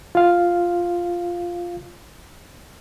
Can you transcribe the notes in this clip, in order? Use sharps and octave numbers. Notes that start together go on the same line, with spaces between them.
F4 F5